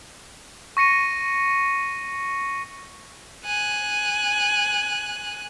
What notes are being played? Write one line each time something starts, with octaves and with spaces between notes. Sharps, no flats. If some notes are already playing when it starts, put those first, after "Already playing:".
C#6 A#6 C#7 D#7
G#5 F#6